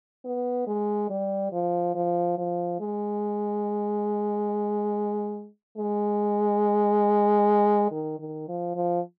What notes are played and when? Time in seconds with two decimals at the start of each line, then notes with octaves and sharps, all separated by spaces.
0.25 B3
0.67 G#3
1.10 G3
1.52 F3
1.95 F3
2.38 F3
2.80 G#3
5.78 G#3
7.91 D#3
8.19 D#3
8.48 F3
8.76 F3